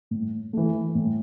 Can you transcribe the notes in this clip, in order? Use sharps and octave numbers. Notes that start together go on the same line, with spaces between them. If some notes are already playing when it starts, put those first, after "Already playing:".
A2
E3 A3
A2